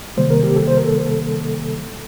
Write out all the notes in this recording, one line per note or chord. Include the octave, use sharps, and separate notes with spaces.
C3 D#3 G3 A#3 C5
A#4
G4
A4
C5
A#4
A4